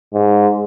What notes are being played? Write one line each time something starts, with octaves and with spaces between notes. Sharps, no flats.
G#2